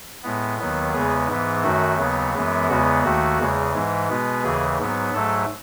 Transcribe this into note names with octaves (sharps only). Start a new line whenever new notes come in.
A2 G#3 B3
D#2 D#3 F#3 B3
E2 C#3 G#3 B3 G#4
G#2 E3 B3
F#2 D#3 A3 F#4
D#2 C#3 F#3 B3
F#2 E3 G#3 B3
E2 C#3 G#3 B3 F#4
D#2 D#3 A3 F#4
E2 C#3 G#3
G#2 E3 G#3
B2 G#3 B3
D#2 C#3 E3 G#4
G#2 F#3 B3
G#2 F#3 A3 A4